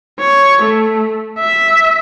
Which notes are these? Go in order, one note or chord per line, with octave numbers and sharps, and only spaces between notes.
C#5
A3
E5